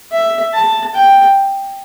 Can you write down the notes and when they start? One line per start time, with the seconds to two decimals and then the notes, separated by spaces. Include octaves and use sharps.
0.12 E5
0.54 A5
0.94 G5